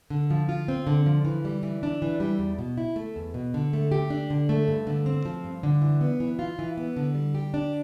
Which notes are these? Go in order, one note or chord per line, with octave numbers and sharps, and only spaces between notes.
D3
F3
F4
C4
D3
F3
E3
G3
E3
D4
E3
G3
E2
B2
E4
A3
E2
B2
D3
A3
G4
D4
D3
A3
G2
D3
C4
F3
G2
D3
E3
B3
E3
F4
E3
B3
D3
G3
G4
D4